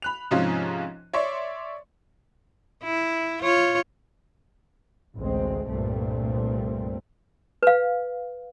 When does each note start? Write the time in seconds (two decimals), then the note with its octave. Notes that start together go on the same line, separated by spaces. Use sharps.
0.02 B5 F#6 F7
0.31 G#2 C3 F3 C#4 D#4 F4
1.13 C#5 D5 E5 C6 C#6
2.83 E4
3.43 F4 C#5
5.16 A1 D2 G#3 C4
5.68 C2 G2 A#2 A3 C4
7.63 B4 F5